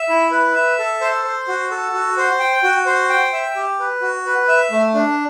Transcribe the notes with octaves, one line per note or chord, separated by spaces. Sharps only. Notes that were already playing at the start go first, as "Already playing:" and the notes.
Already playing: E5
E4
B4
E5
A4
C5
C5
F#4
A4
F#4
C5
G5
F#4
C5
G5
E5
G4
B4
F#4
B4
E5
A3
D4